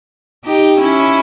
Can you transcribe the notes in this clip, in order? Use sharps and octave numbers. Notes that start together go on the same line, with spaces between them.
D#4 G4
C#4 E4